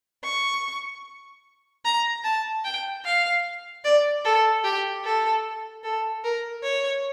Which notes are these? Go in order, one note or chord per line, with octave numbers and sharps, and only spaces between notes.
C#6
A#5
A5
G5
F5
D5
A4
G4
A4
A4
A#4
C#5